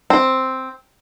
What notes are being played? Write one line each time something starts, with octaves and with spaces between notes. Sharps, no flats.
C4